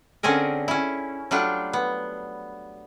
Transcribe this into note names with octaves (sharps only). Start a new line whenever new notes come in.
D3 C4 C#4 G#4 A#4
C#4 E4
F#3 G3 A3 D4 F4
B3